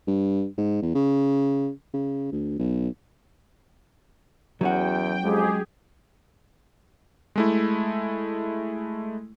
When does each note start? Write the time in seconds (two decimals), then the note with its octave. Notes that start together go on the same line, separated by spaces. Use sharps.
0.08 G2
0.58 G#2
0.82 E2
0.95 C#3
1.94 C#3
2.32 D2
2.59 B1
4.61 E2 F#3 C#4 F#4 G5
5.23 F2 G#3 G4 G#4
7.36 G#3 A3 E4